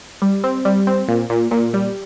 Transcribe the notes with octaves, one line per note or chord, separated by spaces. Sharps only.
G3
C4
G3
C4
A#2
A#2
A#2
G3